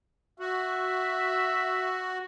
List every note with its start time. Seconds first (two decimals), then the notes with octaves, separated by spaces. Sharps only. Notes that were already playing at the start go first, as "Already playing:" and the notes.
0.40 F#4 E5